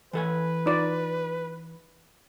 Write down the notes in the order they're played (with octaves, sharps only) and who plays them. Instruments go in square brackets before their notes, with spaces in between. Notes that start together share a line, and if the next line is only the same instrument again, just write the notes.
[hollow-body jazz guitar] E3 A4 G#5 [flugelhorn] B4
[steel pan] D#4 F4 D5